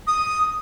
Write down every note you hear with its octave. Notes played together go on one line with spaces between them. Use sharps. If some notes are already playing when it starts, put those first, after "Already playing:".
D#6